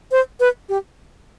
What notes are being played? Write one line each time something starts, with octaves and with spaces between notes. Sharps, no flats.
C5
B4
G4